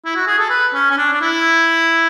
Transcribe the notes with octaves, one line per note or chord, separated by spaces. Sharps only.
E4
F#4
G#4
A4
B4
C#4
C#4
D4
D4
E4